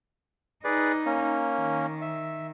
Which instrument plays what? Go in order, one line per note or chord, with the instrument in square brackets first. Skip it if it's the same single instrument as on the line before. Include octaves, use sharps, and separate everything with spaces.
[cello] D#4 [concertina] G#4 B4 D5
[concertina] A#3 C#4
[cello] D#3
[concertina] E5